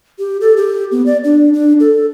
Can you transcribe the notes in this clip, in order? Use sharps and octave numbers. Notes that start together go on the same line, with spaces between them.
G4
A4
G4
B3
D5
D4
D4
A4